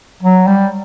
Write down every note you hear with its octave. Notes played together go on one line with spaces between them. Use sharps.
F#3
G3